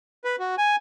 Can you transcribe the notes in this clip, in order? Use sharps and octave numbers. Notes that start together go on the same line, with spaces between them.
B4
F#4
G#5